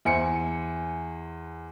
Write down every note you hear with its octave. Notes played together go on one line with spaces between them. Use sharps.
E2 E4 C5 G#5 C#7